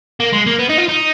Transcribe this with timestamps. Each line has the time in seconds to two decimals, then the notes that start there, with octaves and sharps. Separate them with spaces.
0.20 A#3
0.33 G#3
0.46 A#3
0.59 B3
0.69 D#4
0.78 F4
0.88 D#4